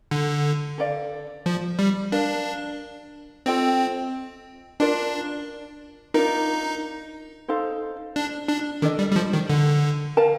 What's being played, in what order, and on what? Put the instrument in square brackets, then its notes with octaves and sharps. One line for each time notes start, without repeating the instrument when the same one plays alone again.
[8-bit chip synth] D3
[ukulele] A4 D5 F5
[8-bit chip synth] F3
G3
[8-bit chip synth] D4 [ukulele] A#4 D5 F5
[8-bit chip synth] C4 [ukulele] F4 A4 D#5 G5
[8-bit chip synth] D4 [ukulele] F4 A#4 D5
[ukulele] D4 F4 A#4 [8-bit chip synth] D#4
[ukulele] D#4 A4 C5 F5
[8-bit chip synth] D4
D4
[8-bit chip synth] D#3 [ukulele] D4 A4 D#5
[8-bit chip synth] G3
G3
F3
D#3
D3
[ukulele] A#4 F5 A5